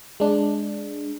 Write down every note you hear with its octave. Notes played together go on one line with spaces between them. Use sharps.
G#3 D4